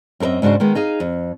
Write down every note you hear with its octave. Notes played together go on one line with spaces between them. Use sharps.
F#2 C4 A#4 D#5 E5
G#2 C#3 D4 F#4 C5
D#3 G#3 B3
D#4 G#4 F5
F2